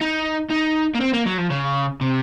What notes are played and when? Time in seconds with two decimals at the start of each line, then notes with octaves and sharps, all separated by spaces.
0.01 D#4
0.51 D#4
0.95 A#3
1.01 C4
1.13 A#3
1.26 F#3
1.38 F3
1.51 C#3
2.01 C3